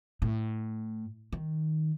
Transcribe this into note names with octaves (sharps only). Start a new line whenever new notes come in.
A2
D#3